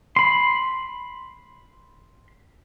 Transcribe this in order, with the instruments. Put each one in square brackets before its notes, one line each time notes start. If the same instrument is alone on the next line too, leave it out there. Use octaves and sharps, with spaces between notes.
[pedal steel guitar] B5 C6